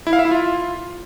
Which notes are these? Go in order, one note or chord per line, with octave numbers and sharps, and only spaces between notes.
E4
F5
E5
E4
F4